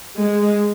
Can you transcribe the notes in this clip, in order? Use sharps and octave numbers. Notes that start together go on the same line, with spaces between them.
G#3